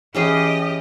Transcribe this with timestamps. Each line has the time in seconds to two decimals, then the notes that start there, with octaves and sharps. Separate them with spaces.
0.15 E3 C#4 G4 G#4 D#5